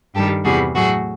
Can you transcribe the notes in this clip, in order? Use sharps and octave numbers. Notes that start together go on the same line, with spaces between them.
G2 D#3 G3 G4 A4
E2 C3 E3 G3 F#4 G#4
A2 F#3 A3 F#4 G#4